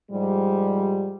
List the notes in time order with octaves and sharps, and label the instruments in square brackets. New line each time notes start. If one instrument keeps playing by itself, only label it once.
[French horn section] G#2 F3 G3